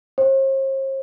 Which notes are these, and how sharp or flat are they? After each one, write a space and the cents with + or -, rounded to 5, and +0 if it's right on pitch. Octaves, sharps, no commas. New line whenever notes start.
C5 +45